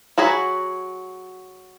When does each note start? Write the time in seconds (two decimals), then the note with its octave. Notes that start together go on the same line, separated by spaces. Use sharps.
0.18 F#3 F#4 G#4 B5